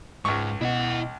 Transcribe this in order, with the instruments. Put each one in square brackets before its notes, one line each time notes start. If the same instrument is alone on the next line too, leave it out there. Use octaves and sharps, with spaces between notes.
[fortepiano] C#2 C#6 [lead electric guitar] G#2
[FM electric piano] B2 B3 D#5 [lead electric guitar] E4 F#5